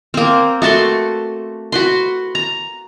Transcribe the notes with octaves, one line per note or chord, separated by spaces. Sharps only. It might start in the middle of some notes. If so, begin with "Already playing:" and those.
A#3 C4
A3 F#4 A5 C6
F#4 B4 C6
A#5